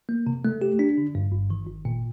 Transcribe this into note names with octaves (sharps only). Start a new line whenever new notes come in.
A#3
C3
A3
G4
D4
D3
G2
G1
D#3
G1
A#2